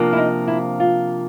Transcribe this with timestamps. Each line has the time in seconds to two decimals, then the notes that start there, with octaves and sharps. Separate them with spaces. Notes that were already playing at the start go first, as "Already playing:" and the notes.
Already playing: C3 F3 A#3 D4
0.13 E4
0.17 D#4
0.48 E4
0.80 F4